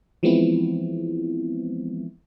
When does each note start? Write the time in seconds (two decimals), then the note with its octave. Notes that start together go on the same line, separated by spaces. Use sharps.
0.23 E3 F3 G#3 B3 C4 E4